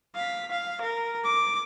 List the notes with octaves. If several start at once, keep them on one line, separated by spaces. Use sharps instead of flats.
F5 B6
F5
A#4
D6